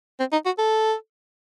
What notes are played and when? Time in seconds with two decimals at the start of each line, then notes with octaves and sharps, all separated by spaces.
0.20 C4
0.32 D#4
0.46 F#4
0.59 A4